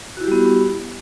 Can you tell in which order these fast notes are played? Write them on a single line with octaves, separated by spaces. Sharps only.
F#4 E4 G4 G3 B3